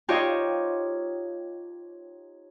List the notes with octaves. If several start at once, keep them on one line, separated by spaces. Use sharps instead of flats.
D#4 F4 G4 C5 C#5 D#5